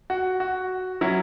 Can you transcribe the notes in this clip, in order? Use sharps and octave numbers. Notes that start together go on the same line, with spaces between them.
F#4
F#4
F#3 C#4 E4